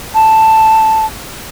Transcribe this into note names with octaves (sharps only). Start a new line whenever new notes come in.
A5